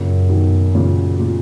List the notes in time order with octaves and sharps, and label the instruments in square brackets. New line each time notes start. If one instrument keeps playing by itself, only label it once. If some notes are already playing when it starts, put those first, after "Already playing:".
Already playing: [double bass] F#2 [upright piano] A#2 C#3
[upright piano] B2 D#3
A#2 C#3
A#2